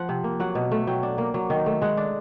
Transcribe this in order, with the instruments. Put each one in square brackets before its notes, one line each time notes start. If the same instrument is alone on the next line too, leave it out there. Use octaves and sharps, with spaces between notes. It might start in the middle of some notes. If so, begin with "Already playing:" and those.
Already playing: [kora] F3 F#5
C3
A#3
F#3 F#5
B2
A3
F#3 G5
D4
A#3
F#3
D#3
A3
G#3 F#5
D4